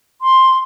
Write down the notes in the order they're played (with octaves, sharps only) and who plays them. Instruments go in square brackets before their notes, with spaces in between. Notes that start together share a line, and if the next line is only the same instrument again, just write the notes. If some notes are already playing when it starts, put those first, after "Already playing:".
[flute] C6